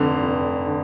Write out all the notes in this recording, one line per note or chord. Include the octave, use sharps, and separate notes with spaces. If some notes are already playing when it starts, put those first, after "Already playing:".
Already playing: F1 F2 D3
F1
D3